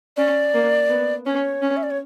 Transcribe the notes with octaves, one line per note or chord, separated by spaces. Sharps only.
C#4 D5
A#3
B3
C#4 C#5
C#4
E5
D5
C#5